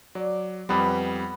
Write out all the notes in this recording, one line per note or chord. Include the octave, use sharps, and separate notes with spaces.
F#3 D5
F2 G3 B3 B4